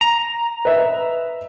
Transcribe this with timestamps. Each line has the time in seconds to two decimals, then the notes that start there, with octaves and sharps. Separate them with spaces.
0.01 A#5
0.65 B4 D#5 E5